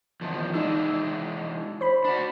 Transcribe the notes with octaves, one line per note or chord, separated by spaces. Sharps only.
E2 D#3 F3
E3 G#3 D4 D#4 E6
C5 B5
D4 F#4 B5